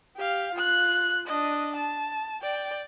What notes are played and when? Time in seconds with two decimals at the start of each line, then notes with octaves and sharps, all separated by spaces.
0.16 G4 F5
0.54 F4 F#6
1.27 D4 D#5
1.76 A5
2.42 D5 G5